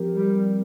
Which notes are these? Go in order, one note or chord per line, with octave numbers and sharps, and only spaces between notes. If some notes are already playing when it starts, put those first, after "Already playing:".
Already playing: F3 C4 G4 A#4
G3